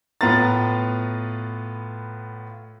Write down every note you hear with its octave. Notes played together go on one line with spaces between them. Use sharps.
A2 B3 F4 A#5 A6